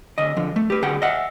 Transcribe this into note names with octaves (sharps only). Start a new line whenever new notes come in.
D2 D#5
D3 F3
A3
G4 B4
D2 G#4 F#5 G5
D#5 E5 F#5